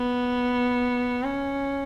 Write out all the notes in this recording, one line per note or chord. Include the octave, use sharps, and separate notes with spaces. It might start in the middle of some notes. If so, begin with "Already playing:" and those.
Already playing: B3
C#4